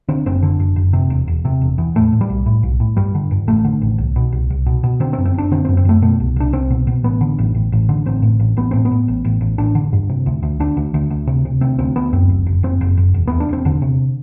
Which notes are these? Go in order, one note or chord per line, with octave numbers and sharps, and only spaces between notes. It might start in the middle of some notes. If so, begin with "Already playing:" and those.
D3 C4
F#1 C4
D3
F#1
F#1
C3
E1
E1
C3
E1
E2
A2 A3
A2
G3
B1
A2
B1
A2
G2 G3
D3
G2
A1 A3
D3
A1
C2
B2
C2
C2
B2
B2
D3 C4
C4
F#2
C4
F#1 D4
D3 C4
C4
F#2
C4
F#2 A3
B2 A3
C2
C2 D4
C2 C4
B2
B2
A1 B3
D3
A1
A1
A1
D3
A1 C4
A2
A1
A1 B3
A2 C4
B3
A2
A1
A1
A1
A1 D4
D3
G2
C3
D2
D2
D2 D4
D2
D2
D2
C3
C3
D2 C4
D2 C4
D2 B3
F#2 C4
F#1
F#1
F#1 C4
F#1
F#1
E1
E2 B3
D4
E1 C4
E1 D3
C3